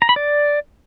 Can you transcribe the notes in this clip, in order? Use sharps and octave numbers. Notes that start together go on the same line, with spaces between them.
A#5
B5
D5